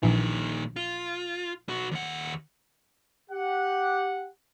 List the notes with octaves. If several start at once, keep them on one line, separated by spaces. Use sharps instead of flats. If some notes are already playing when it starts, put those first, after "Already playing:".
A#1 A#2 D#3 E3
F4
B1 F#4
D#2 F#5
G4 F#5